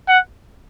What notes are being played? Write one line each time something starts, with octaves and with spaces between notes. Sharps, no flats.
F#5